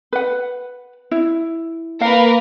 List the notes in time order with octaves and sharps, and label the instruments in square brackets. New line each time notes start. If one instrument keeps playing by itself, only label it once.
[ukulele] B4 F#5
E4
[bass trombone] A#3 [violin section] A#4 B4 [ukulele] F5